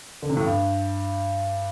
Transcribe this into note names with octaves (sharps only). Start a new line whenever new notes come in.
D3
C3
A2
G2